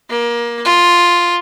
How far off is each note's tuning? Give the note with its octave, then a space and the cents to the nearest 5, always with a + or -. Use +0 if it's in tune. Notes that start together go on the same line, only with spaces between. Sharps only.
A#3 +25
F4 +5